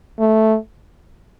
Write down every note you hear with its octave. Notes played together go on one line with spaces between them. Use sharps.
A3